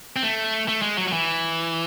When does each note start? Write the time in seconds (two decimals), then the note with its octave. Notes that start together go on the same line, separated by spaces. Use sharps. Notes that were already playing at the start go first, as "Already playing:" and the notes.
0.16 C4
0.23 A3
0.68 A3
0.82 G#3
0.97 F#3
1.08 F#3
1.13 E3